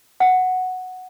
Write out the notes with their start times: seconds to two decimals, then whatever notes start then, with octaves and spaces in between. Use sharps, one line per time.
0.20 F#5